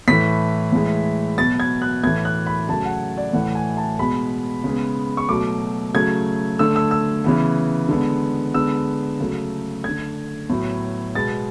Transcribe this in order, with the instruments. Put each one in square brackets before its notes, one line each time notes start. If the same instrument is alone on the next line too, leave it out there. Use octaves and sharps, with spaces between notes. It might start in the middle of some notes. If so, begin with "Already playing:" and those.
[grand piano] A2 E3 A3 B6
A2 E3 G#3
B2 F#3 B3 A6
G#6
F#6
A2 E3 A3 G#6
F#6
B5
C#3 F#3 A3 A5
F#5
D5
A2 E3 A3 F#5
G#5
A5
B2 G#3 B3 B5
C#3 G#3 B3
C#6
B2 F#3 A3 D6
C#3 F#3 A3 G#6
D3 A3 E6
E6
E6
C#3 E3 B3
D3 G#3 B3
D3 G#3 B3 E6
C#3 F#3 A3
D3 A3 G#6
A2 F#3 B3
B2 G#3 B3 A6